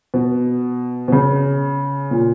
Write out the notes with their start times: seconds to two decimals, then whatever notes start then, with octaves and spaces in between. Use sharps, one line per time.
0.14 B2
1.08 B2
1.12 C#3
2.11 A#2